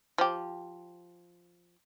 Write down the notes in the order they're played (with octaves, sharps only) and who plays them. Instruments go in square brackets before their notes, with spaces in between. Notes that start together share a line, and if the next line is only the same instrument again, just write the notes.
[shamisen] F3 G4